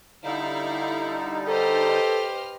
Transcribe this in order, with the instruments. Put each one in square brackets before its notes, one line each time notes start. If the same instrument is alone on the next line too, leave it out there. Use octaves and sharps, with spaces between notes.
[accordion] D3 G3 D#4 [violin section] E4 F5
[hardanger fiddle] G4 C5 [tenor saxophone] A4 [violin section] B4 D#5 F6